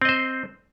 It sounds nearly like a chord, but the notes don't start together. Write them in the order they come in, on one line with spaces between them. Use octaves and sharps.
C4 D#5 C5